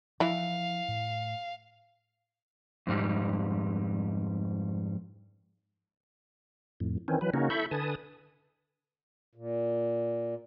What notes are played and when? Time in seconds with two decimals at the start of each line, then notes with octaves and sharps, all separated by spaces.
0.20 E3 F3 E4 F5
0.88 A2
2.87 F2 G#2 G3
6.80 F2 A2
7.08 D#3 E3 C4 C#4
7.21 E3 F#3 B4
7.34 C#3 A#3 C#4 D#4 F#4
7.50 E4 A4 E5 B5 C#6 G6
7.71 D3 B4 G#5 A5 D#6
9.35 A#2